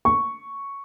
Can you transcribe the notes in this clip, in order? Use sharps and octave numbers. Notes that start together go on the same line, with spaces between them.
C#6